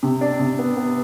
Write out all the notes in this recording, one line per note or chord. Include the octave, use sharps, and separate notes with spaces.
C3
D4
C3
B3
B3